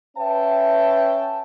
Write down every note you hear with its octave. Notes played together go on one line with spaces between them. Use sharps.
C#4 B4 E5 G5 A5